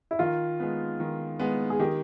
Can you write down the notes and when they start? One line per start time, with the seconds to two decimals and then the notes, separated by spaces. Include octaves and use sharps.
0.11 E4
0.19 D#3 F4
0.60 G#3 B3
1.00 D#3
1.40 G#3 B3
1.70 G#4
1.80 D#3 G4